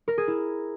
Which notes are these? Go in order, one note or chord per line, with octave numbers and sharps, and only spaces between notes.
A#4
G#4
E4